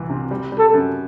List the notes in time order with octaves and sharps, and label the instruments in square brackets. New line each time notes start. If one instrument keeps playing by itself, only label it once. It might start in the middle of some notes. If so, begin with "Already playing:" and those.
Already playing: [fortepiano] C2 E3
C3
G3
G3
[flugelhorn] A4
[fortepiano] F#2